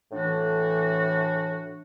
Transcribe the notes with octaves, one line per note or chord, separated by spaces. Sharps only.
A2 E3 D4 F#4